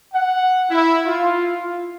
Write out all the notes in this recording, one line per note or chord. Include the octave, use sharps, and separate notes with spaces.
F#5
E4
F4